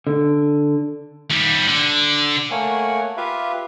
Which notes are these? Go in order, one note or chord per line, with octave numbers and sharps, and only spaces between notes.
D3
D#2 G3
D3
A3 A#3 A#4 C#5 F#5 G#5
F4 G4 B4 E5 F5